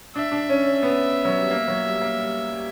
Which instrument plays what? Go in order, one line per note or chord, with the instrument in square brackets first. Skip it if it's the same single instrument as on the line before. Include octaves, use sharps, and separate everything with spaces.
[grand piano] D4 [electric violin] E5
[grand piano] D4
C#4
C#4
B3
F#3
G3
A#3
F#3
G3
A#3
G3
G3